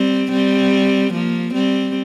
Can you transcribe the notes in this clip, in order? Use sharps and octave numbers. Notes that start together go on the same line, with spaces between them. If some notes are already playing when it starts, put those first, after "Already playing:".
Already playing: G3 C4
G3 C4
F3 A#3
G3 C4